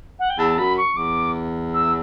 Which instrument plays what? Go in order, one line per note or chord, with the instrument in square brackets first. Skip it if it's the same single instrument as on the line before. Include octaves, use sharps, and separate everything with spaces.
[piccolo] F#5
G5
[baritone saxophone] E2 [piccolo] A5
[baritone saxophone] F#2 [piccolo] B5
[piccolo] C#6
[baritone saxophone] E2 [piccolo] D6
[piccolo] E6